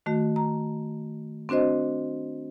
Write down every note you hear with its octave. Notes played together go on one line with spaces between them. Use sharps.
D#3 A3 F#4
A#5
C4 D4 F#4 C5 D#5